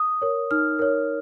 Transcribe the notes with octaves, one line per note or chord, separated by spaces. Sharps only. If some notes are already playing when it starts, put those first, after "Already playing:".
Already playing: D#6
A#4 C#5
D#4 F6
A#4 C#5